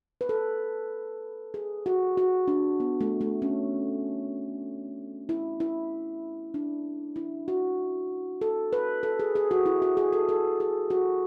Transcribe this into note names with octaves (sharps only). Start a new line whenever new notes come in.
B4
A4
G#4
F#4
F#4
D4
B3
A3
A3
C#4
E4
E4
D4
E4
F#4
A4
B4
A4
G#4
G#4
F#4
E4
F#4
G#4
A4
A4
G#4
F#4